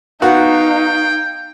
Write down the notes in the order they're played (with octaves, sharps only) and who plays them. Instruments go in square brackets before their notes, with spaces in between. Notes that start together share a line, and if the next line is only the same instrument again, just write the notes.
[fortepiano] B3 F#4 [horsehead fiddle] D#4 [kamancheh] F5 [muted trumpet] G5